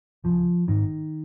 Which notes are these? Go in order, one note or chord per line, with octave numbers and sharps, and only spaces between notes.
C#2 C#3 F3
G#1 G#2 D#3